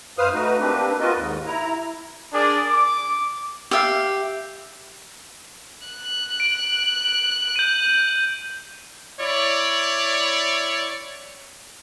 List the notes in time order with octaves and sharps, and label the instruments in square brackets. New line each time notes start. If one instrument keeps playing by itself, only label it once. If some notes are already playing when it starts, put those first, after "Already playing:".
[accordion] F#2 B4 C5 F5 D#6 F6
A3 D#4 F#4 B4
A#3 C4 D4 G4 B4
C4 F4 F#4 A#4 B4 D#5
D#2 G#2
E4 A#5
[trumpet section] D4 G#4 A#4 D5
D6
[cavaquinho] G4 E5 F5
[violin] F#6
[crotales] D7
G6 D#7
[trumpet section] E4 C#5 D5